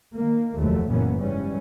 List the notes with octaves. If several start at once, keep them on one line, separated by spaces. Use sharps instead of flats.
D#3 A#3
F1 D#2 B2 F3 F#3 A3
F#1 A#2 E3 A#3 B3 C#4
G#2 E3 G3 C#4